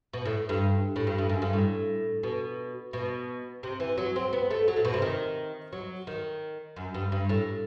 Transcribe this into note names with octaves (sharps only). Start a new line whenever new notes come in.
B2
A2
G2
A2
G2
G2
F#2
G2
A2
B2
B2
C3
E3
F#3
C4
B3
A3
F#3
A2
B2
C3
D#3
F#3
D#3
F#2
G2
G2
A2